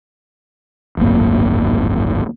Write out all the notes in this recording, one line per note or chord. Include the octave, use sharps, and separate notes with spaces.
D1 G#1 F#2 A#3